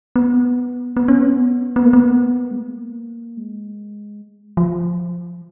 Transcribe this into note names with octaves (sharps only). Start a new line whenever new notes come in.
B3
B3
C#4
B3
B3
A#3
B3
G#3
A#3
G#3
F3